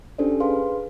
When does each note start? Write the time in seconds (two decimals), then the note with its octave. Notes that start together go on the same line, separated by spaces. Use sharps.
0.18 C#4 D4 G4 A4 C5 D5
0.40 G#4 B4 F5 C6